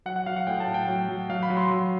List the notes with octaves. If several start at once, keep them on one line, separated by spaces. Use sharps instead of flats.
F#3 F#5
F#5
F#3 F5
F#5
A2 G5
A5
A2
G5
F#3
F#3
F#3 F5
B5
F#3
C6
F#3